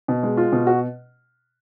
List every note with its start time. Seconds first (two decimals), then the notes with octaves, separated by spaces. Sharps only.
0.08 B2
0.23 G#3
0.37 F4
0.52 B2
0.67 F#4